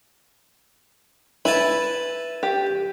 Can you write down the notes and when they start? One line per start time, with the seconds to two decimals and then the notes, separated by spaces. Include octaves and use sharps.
1.45 E4 B4 G#5 A5
2.43 G4